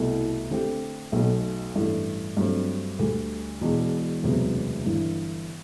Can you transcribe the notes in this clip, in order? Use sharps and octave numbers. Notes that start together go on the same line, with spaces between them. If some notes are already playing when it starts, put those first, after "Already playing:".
Already playing: C2 B2 A3 E4
D3 A3 C4 G4
B1 B2 A3
A1 G2 E3 A3
G2 F#3 A3 C4
D2 D3 G3
E1 E2 B2
E1 D2 C3 F#3 B3
G1 G2 E3